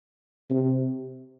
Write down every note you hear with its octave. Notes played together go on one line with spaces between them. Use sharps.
C3